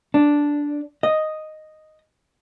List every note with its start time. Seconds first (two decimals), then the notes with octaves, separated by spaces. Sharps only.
0.14 D4
1.03 D#5